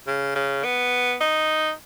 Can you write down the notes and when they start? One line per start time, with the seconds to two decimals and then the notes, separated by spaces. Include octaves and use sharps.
0.07 C#3
0.36 C#3
0.64 B3
1.21 D#4